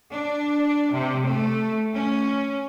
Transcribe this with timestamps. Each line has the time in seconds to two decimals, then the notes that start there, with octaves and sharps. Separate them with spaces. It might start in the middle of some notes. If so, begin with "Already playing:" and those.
0.12 D4
0.92 C3
1.27 A3
1.95 C#4